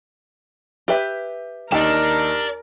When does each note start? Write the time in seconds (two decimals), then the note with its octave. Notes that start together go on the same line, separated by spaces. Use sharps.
0.88 G4 B4 E5
1.72 D#2 D#4 G4 A#4 D5 A5